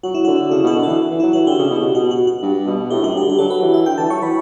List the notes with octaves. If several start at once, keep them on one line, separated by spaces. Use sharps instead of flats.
F#3 F#4
E4
D3 F#4
C#3 E4
B2 F#4
D3
E3 A4
E3
F#3 E4
E3 F#4
D3 G4
C#3
B2
C#3
B2 F#4
F#4
F#4
G2
B2
A2 G4
F#2 F#4
G2 G4
D3 G4
F#3 A4
B4
E3
E5
D3 G5
E3 A5
F#3 C#6
E3 B5